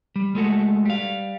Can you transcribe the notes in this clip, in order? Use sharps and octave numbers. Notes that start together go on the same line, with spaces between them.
G3
G#3 A3 F#4 A4
G3 F5